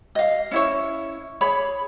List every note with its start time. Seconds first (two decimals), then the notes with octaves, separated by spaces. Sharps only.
0.15 D#5 F5
0.51 C#4 E4 C#5
1.41 G#4 C#5 B5